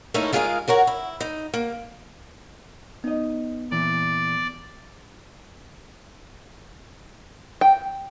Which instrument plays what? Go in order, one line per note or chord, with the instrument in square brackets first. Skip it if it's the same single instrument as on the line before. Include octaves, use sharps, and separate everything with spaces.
[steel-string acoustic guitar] A3 A#3 C#4 D#4 E4
G#3 F4 G#4 A#4 E5 F5
F#4 A#4 C#5 F#5
E4
D#4
A#3
[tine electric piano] B3 [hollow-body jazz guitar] D#4 D#5
[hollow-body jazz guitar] A#2 E3 [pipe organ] D5
[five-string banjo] G5